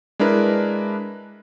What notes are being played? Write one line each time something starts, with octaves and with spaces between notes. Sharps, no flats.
G#3 D4 E4 A#4 B4